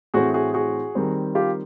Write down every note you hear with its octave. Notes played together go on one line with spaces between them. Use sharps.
A2 E3 A3 C4 F#4 G#4
F#4 G#4
F#4 G#4
D#3 G3 C4
F4 G4